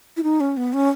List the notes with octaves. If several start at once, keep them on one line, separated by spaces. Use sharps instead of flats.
E4
D#4
C#4
B3
C#4